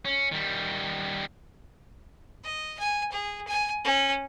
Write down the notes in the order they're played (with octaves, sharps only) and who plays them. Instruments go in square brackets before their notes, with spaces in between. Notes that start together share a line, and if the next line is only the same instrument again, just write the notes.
[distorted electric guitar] C#4
D#3 G3
[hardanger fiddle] D#5
G#5
G#4
G#5
C#4